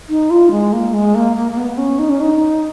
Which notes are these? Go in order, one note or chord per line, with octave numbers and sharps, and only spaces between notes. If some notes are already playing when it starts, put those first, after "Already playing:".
D#4
F4
G#3
A#3
G#3
A#3
A#3
A#3
B3
C#4
D#4
C#4
D#4